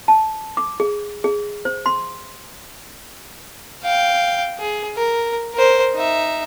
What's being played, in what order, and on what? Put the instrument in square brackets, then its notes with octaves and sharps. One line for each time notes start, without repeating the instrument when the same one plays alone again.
[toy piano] A5
D6
G#4
G#4
C5
C6
[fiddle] F5 G5
G#4
A#4
A#4 C5
D#4 E5